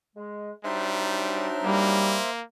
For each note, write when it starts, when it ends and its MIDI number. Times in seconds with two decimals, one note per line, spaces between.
0.16 0.50 56
0.64 2.30 54
0.64 1.48 55
0.64 2.30 62
0.64 2.30 63
0.64 2.30 72
0.64 2.30 76
0.64 2.30 84
1.64 2.19 55
1.64 2.42 58